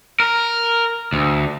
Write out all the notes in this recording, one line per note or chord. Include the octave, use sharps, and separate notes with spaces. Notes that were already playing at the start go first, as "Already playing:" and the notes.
A#4
D2